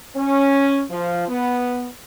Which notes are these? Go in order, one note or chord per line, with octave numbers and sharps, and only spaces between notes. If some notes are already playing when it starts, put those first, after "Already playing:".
C#4
F3
B3